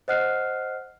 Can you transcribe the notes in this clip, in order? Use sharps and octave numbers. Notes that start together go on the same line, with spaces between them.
C5 D#5 F#5 F6 F#6 C7